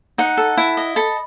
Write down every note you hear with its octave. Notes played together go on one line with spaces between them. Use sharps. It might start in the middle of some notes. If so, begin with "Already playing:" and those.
D#4 F#5
A4
E4
D#5
A4 B5